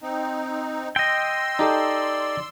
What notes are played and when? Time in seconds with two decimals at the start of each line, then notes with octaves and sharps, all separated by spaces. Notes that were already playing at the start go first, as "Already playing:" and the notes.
0.02 C4 D#4
0.96 D#5 G5 C6 E6
1.59 D#4 G4 A4 D5